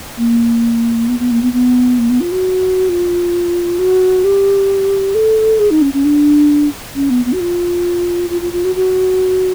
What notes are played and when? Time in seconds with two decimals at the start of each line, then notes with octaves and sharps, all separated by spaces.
0.18 A#3
1.08 B3
1.19 B3
1.31 A#3
1.42 B3
1.52 B3
1.98 A#3
2.09 B3
2.20 F4
2.32 F#4
2.89 F4
3.79 F#4
4.24 G4
5.14 A4
5.59 G#4
5.70 D#4
5.81 C#4
5.93 C#4
6.04 D4
6.95 C#4
7.10 B3
7.25 B3
7.32 F#4
7.40 F4
8.30 F4
8.41 F4
8.53 F4
8.64 F#4
8.75 F#4